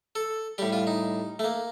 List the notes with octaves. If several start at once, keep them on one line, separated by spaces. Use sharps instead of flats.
A4
A2 G3 G4
F4
D#4
A3
A#3